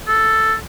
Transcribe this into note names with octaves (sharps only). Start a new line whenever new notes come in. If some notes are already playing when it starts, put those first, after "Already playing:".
A4